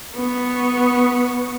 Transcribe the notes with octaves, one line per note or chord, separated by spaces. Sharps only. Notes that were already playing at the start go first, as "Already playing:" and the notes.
B3 C#6